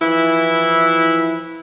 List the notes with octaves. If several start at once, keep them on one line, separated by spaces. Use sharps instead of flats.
E3 F3 E4